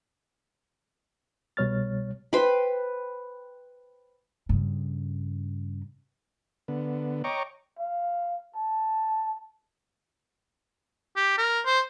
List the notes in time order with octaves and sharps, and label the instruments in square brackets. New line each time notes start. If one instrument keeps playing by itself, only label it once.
[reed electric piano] C2 B2 G3 C#5 F6 A6
[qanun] B4 C5 G5 B5
[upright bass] G2 C#3
[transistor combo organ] D3 B3
C#5 D#5 G5 A#5 C#6 D6
[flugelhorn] F5
A5
[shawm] G4
A#4
C5